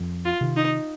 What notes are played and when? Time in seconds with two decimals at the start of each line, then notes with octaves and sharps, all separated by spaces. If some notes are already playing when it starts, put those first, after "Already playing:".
Already playing: F2
0.25 F4
0.41 C3 D#3
0.57 D#4